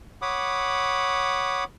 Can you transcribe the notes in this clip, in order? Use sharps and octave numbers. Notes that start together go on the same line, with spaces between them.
C#5 F#5 B5 D6 D#6